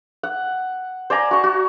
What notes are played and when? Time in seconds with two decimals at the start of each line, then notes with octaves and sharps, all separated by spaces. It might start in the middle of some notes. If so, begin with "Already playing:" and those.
0.23 F#5
1.10 C5 D5 G#5 A#5
1.31 F#4 C#6
1.44 F#4